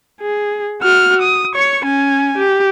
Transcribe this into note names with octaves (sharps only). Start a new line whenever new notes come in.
G#4
F#4 F6
D#6
C#5 C#6
C#4 G#5
G4